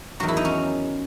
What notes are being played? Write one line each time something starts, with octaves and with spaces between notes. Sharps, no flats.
E2 D#3 F#3 F#4
E4
D#4
C#4